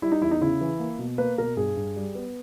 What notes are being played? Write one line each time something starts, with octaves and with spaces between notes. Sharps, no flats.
G3 E4
D#4
E2 E4
D#4
C#3 E4
E3
A#3
B2
A#3 B4
B2 A#4
G2 G#4
G2
G3
B3